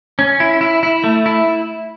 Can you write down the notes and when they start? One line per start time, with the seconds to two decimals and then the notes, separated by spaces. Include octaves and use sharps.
0.19 C#4
0.40 E4
0.61 E4
0.83 E4
1.04 A3
1.26 E4